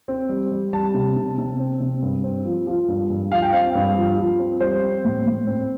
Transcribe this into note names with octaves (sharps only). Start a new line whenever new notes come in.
C4
G3
G3
G3 A5
C3
C3
C3
C4
C3
G2
C4
F3
F3
G2
G2
F3 F5
G5
C4 F5
G2
F3
F3
C4
G3 C5
C4
A2
A2
C4